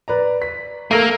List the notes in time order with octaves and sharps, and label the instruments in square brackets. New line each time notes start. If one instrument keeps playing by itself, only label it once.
[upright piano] B4 D5 A#5
B6
[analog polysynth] A3 A4 A#4 [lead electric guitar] A#3 [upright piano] E6 A#6 D#7